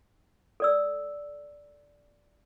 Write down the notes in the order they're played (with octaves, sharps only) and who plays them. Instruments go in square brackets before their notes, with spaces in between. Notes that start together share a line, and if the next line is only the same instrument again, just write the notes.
[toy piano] A4 D5 E6